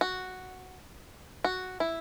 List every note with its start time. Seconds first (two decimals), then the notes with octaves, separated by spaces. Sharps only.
0.01 F#4
1.44 F#4
1.80 E4